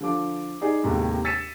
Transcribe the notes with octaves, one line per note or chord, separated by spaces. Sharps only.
D3 F3 D6
D#4 G#4 D5
D#2 A2 C3 G#3 A3
E6 A6 B6 C#7 D#7 E7